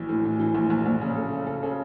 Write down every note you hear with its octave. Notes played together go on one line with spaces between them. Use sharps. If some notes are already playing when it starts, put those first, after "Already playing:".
Already playing: A#1 E3
A2
E3
E3
A#1
A#1
A#1
C#3
A4
A4
A4
C#3